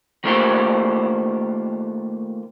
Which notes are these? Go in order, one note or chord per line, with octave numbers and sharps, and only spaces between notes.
D#3 A3 A#3 F4 G4 C5